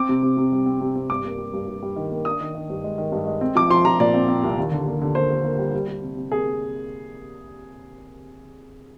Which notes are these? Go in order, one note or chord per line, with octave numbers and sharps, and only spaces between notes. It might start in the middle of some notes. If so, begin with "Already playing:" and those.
Already playing: C4 D6
C3
C3
C3
G3
C4
C3
C4
G2 D6
A#3
G3
G2
G2
G3
D#3
A#3
D4 D#6
D#3
D#3
G2
G#3
D#3
G2
G#3
C4
F3 D6
F3 C6
F3 A#5
A#2 D5
C4
C4
C2
D#2
D3
A#3
D3
A#3 C5
A#3
A#3
G3
G3
G3
C3
C3
A#3 G#4
A#3